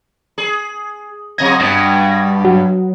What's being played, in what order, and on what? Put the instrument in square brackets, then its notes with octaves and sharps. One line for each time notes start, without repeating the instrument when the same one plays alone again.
[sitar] G#4
[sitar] F#2 C3 D#5 [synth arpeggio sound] G#6 A#6
[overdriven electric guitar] G2 [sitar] B2
[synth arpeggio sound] F#3